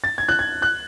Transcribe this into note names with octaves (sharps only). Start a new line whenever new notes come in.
A6
G#6
F#6
G#6
F#6